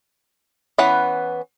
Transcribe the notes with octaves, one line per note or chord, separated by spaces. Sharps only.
E3 B3 C#4 B4 F#5